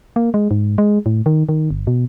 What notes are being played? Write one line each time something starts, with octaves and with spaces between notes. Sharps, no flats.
A#3
G#3
G#2
G#3
A2
D#3
D#3
G1
B2